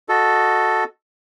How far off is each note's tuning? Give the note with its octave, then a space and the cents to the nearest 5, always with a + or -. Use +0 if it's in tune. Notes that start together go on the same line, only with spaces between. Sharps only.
F#4 -10 A4 +0 D#5 +0